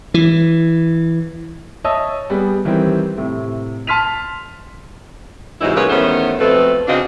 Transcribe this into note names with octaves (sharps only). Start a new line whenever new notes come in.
E3
C#5 D#5 E5 A5 D#6 E6
G3 B3 G#4
D#3 E3 G3 C4
A2 C3
A5 C6 F6 B6 D#7 F7
G#2 C3 E3 F#3 D#4 E4
C#3 G#3 A#3 F#4 B4 C#5
E2 D#3 A3 B3 C#4 C5
F2 B2 A3 C4 A4 B4
C#3 C4 D4 F4 F#4 D#5